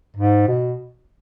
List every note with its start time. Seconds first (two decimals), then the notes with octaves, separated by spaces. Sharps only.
0.16 G#2
0.48 B2